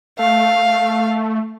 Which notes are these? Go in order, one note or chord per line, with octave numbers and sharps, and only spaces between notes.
A3 F5